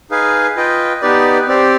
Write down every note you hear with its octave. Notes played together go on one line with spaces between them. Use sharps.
D#4 G#4 B4 F5 G#5
F4 B4 D#5 G5
B3 D#4 G4 B4 D5
C4 G4 D5